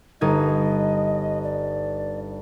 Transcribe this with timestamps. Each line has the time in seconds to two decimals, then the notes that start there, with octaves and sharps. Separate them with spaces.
0.21 G1 D#4 D#5 G#6
1.43 D5